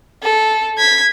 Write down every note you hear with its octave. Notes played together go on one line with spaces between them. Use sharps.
A4
G#6 B6